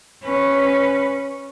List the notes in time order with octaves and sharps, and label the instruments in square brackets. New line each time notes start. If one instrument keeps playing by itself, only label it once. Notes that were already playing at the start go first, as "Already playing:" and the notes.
[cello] C#4 B4